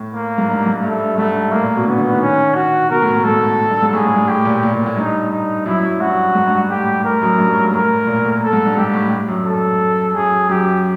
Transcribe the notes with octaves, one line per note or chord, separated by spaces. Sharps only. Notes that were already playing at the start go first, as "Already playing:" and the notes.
Already playing: A2
A#3
G#2
G2
G#2
G2 A3
G2
G#2 A3
G2
A2 A#3
A#2
B2
D3 B3
D3
D#3
C#4
F#4
B2 A#4
A2
A2
G#2 A4
G2
G#2
A2 G#4
A2
G2
A2 G4
A#2
A#2
A#2
A2
G2 D#4
D#4
F#2 E4
F#2
G2 F#4
G#2
G2
G2
A2 G4
A2 A#4
F#2
G2
F#2
G#2
A2 A#4
A#2
A2
A4
G#2
G2
G#2 G4
A2
F#2
A4
F#2 G#4
F#2 G4